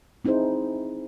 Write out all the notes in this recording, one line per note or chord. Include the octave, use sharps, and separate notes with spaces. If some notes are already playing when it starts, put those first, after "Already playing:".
C4 D#4 E4 G#4 C5